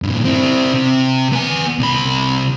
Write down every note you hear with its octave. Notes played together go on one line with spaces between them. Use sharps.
G2 A#2
C4 E4
C3
B3 G#5
C2 B5